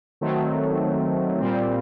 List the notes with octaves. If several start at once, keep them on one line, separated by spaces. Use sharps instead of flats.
D#3 F#3 A3 C4
A#2 G3 C4